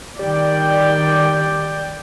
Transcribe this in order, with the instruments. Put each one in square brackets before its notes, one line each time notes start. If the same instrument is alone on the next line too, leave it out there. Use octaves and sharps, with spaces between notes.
[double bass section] D#3 [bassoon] G3 [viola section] D5 G5